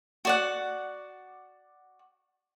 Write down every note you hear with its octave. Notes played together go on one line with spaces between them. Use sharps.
F#4 D5 F#5